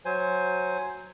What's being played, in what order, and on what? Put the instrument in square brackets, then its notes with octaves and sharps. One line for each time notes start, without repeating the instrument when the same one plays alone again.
[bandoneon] F#3 C5 G#5